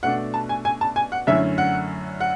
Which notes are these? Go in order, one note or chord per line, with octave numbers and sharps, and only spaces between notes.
B2 A3 D4 F#5
A5
G#5
G#5
A5
G#5
F#5
F#2 D3 A3 C#4 E4 E5
F#5
F#5